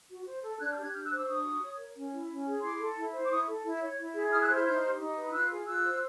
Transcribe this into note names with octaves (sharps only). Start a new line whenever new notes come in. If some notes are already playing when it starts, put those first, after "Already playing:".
F#4
C5
A4
D4 F#6 G#6
F6 G6
G4
F#6 G#6
D4 F6 G6
E6 F#6
C5
D6 E6
D4 C#6 D#6
F#4
C#5
A#4
C#4
E4
C#4
G#4
E4 C6 D6
A4
E4
C5
D6
E4 C#6 D#6
A4
E4
C#5
E4
G#4
E4 D#6 F6
E6 F#6
C5 F6 G6
D#4 F6 G6
G4
D#4
B4
F4 E6 F#6
G#4
F4 E6 F#6
C5